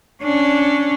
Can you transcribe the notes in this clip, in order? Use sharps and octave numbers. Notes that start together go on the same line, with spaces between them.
C#4 D4